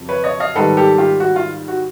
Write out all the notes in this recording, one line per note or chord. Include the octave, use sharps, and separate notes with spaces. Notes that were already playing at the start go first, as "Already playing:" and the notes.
Already playing: F2 C#3 F#3
B4 C#5
C#5 D#5
D#5 F5
G#2 D#3 G3 A4 B4
G4 A4
F4 G4
F#4
F4
F#4